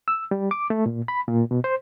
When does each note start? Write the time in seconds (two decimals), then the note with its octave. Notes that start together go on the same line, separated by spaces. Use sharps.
0.08 E6
0.31 G3
0.51 D6
0.70 A3
0.86 A#2
1.08 B5
1.27 A#2
1.51 B2
1.64 C5